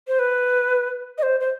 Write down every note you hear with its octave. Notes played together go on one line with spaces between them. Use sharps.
C5
B4
D#5
C5
C5